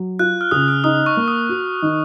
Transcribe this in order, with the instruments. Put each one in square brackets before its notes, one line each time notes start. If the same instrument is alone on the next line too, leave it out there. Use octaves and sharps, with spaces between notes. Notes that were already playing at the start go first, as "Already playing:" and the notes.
Already playing: [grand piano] F#3
[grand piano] F4 [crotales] F#6
[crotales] F6
[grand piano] C#3 [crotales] D#6
[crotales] F6
[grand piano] D#4 [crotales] D#6
[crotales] C#6
[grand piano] A#3
[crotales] D#6
[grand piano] F#4
D#3